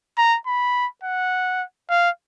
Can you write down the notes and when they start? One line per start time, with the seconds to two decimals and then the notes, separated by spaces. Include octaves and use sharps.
0.18 A#5
0.47 B5
1.04 F#5
1.90 F5